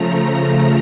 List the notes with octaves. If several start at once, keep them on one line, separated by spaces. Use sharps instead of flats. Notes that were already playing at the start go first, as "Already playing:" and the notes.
Already playing: C#3 F3 A3 A#5